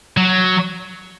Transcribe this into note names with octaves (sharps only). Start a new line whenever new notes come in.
F#3